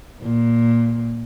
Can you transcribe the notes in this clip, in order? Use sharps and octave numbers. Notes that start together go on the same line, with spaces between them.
A#2